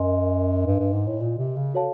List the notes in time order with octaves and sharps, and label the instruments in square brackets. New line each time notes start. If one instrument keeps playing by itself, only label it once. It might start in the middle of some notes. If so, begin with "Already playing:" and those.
Already playing: [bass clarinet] F#2 [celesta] A#4 D#5 G#5 C6
[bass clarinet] G2
G2
G#2
A2
A#2
C3
C#3
[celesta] F#4 A4 C#5 F5 A5